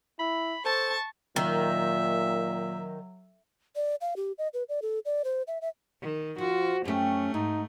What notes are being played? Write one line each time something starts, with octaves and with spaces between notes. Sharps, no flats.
E4 B5
A4 C5 A5 C#6
A#2 D#3 F#3 E5
D5
F5
G4
D#5
B4
D5
A4
D5
C5
E5
E5
D#3
F3 F4 F#4
F#2 A3 C#4 G4
G#2 D#4